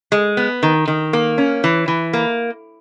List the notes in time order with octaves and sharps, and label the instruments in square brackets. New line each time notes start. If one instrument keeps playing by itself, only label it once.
[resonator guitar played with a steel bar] G#3
B3
D#3
D#3
A#3
C#4
E3
E3
A#3